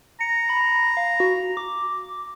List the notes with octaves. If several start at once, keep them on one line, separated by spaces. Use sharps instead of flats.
A#5 C#7
B5
F5
F#4
D6